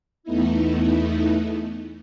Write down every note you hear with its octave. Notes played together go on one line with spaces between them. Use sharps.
E2 A3 B3 D#4 E4